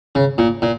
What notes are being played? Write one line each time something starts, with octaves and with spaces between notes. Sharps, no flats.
C#3
A#2
A#2